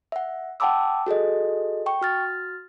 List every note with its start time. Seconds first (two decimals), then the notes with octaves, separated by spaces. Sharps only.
0.12 E5 F#5
0.60 F#5 G5 A5 B5 D6 E6
1.07 F#4 G#4 A4 D#5
1.86 G5 C#6
2.01 F#4 F6 A6